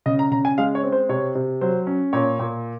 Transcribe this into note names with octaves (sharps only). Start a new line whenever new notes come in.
C#3 D#5
A#5
C#3 A#5
G#5
G#3 F5
C#5
C4
C5
C3 C#5
C3
F#3 C5
C#4
A#2 C#5
A#2